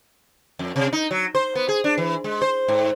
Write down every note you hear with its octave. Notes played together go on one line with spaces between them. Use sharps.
F2
C3
D#4
F#3
C5
B3
G#4
D4
E3
G#3
C5
G#2